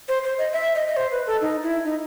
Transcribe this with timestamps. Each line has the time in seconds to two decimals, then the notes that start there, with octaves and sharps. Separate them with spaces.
0.08 C5
0.24 C5
0.38 D#5
0.53 E5
0.75 D#5
0.87 D#5
0.97 C5
1.11 B4
1.27 A4
1.41 D#4
1.63 E4
1.85 D#4